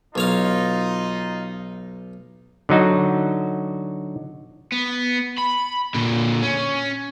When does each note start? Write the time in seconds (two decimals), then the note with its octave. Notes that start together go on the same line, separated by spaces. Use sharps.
0.15 B1 D#4 F4 C#5 F5
2.69 D3 F#3 D#4 F#4
4.72 B3
5.38 B5
5.94 A#2 D3
6.42 C#4